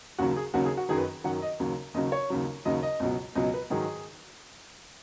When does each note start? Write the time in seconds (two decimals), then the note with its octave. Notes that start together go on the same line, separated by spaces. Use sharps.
0.18 D#2 C#3 F#3 F#4
0.36 G#4
0.54 D#2 C#3 F#3 F#4
0.65 G#4
0.77 F#4
0.89 F#2 D#3 F#3 G#4
0.98 B4
1.24 F#2 D#3 F#3 F#5
1.42 D#5
1.60 D#2 C#3 F#3
1.94 D#2 C#3 F#3 D#5
2.12 C#5
2.30 D#2 C#3 F#3
2.65 D#2 C#3 F#3 D#5
2.83 D#5
3.00 C#2 B2 F#3
3.35 C#2 B2 F#3 D#5
3.54 B4
3.70 G#2 D#3 F#3 G#4